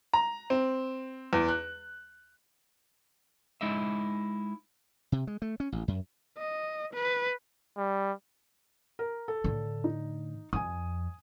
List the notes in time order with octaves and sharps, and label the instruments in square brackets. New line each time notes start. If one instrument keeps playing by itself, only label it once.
[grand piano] A#5
C4
E2
F#6
[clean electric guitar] G#3 D#4 E4 D#5 E5
[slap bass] C3
G#3
A3
C#4
A1
F#2
[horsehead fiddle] D#5
B4
[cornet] G3
[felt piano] A#4
A4
[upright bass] A2 D3
[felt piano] D#4
[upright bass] F2 [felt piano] G#5 D#6